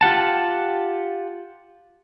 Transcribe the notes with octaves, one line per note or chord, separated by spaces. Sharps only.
F4 G4 F#5 A5